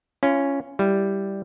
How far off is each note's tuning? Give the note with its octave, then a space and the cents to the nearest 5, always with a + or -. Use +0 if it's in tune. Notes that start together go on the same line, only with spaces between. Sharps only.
C#4 +0 F4 -35
G3 +0 E4 +0